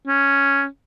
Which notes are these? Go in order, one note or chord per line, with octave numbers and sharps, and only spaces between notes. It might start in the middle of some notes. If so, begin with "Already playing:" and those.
C#4